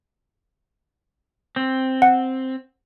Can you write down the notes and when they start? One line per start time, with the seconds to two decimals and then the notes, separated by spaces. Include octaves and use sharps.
1.56 C4
2.02 F#5